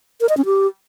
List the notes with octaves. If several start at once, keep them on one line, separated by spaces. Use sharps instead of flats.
A#4
D#5
C#4
G4